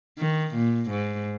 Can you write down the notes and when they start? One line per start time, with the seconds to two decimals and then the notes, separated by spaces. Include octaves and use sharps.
0.19 D#3
0.55 A#2
0.90 G#2